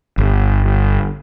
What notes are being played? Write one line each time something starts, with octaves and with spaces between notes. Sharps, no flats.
G1